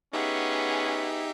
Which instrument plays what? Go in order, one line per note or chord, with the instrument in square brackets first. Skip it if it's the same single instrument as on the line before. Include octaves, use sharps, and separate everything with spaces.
[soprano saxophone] B3 [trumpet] C#4 [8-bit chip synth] D#4 G4 E5 [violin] G#4 F#5